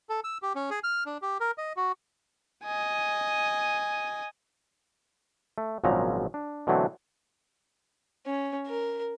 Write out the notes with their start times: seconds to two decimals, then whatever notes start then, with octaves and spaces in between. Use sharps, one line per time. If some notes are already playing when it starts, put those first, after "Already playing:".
0.09 A4
0.24 E6
0.42 G4
0.55 C#4
0.70 G#4
0.84 F6
1.06 D4
1.22 G4
1.40 A#4
1.58 D#5
1.77 F#4
2.64 D#5 G#5
5.58 A3
5.84 G#1 A#2 C#3 F3 F#3 A#5
6.34 D4
6.67 B2 D3 E3 F#3 A3 C4
8.26 C#4
8.67 A#4